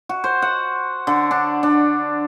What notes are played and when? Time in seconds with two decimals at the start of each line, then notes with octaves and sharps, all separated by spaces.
0.09 F#4
0.24 C5
0.42 F#5
1.07 D3
1.31 D4
1.63 D4